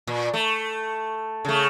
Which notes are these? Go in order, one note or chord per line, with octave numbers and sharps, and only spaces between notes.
A#2
A3
C#3 A3